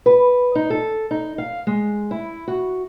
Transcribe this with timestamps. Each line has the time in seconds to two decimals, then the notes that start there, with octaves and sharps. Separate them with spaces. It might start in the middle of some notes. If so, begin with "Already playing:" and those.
0.06 B4
0.55 D#4
0.70 A4
1.11 D#4
1.38 F5
1.67 G#3
2.11 E4
2.48 F#4